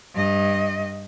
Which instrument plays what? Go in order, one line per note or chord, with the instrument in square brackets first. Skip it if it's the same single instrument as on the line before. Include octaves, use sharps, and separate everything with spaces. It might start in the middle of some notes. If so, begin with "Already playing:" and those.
[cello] G2 D#5